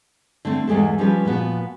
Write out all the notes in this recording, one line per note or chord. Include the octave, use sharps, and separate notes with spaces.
D3 A3 C4
E2 G#2 G#3 G4 A4
F3 G3 C#4 F4 G4 B4
A#2 F3 B3 F#4